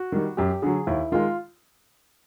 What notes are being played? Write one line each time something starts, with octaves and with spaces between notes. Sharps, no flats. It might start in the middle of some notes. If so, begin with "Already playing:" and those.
Already playing: F#4
D#3 G3
F#2 G4
D3 F#3 G#4
D#2 E4
D#3 G#3 F4